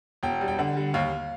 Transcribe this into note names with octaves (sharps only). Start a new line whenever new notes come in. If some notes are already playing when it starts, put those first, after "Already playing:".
E1 G5
G3
G5
D3 F#5
G3
D#2 F5